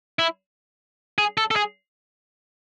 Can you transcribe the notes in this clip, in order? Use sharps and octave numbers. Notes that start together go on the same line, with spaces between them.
E4
G#4
A4
A4
G#4